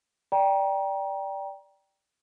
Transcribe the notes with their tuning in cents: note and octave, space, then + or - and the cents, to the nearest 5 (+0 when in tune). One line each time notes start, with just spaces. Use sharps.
D5 -5 G5 +0 A#5 +25